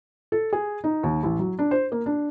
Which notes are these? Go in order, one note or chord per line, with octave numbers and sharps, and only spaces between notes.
A4
G#4
D#4
D#2
A1
F#3
D4
C5
A#3
D4